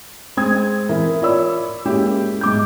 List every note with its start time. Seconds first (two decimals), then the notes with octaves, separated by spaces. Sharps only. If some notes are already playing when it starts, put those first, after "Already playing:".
0.37 G#3 C4 D#6 G#6
0.89 E3 E4 A#4
1.22 F4 A#4 C#5 D5 B5 E6
1.85 G#3 A#3 C#4 E4 F#4 G4
2.41 G#2 D6 G6